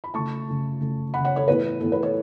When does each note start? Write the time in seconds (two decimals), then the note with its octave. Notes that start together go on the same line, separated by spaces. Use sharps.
0.04 B5
0.14 C#3 A3 A5 C#6
0.48 C#3 A3
0.81 C#3 A3
1.14 A3 F#5 B5
1.18 C#3
1.25 C#5 F#5
1.36 A4 C#5
1.48 A2 E3 B3 B4
1.80 A2 E3 B3 A4
1.92 B4
2.02 A4 C#5